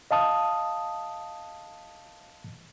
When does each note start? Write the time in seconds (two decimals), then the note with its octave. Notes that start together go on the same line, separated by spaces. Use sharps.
0.11 D#5 F5 A5 D#6